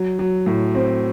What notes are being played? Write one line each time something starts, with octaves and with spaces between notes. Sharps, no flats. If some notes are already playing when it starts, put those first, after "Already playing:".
Already playing: F#3
F#3
A2
C4